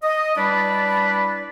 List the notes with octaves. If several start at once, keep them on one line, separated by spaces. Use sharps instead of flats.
D#5
G3 D4 E4 B4 D5